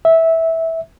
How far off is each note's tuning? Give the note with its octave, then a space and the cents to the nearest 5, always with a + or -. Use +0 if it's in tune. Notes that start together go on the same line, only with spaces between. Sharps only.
E5 -15